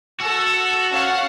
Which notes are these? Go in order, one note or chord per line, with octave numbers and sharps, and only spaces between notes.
F#4 A4 E6
C#4 F5 F#5